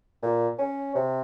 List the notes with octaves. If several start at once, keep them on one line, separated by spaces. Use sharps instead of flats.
A#2
C#4
C3